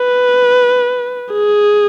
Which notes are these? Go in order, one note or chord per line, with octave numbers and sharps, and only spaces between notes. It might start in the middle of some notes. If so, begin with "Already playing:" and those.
Already playing: B4
G#4